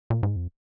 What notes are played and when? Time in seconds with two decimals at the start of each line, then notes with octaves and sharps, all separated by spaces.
0.10 A#2
0.23 G#2
0.36 F2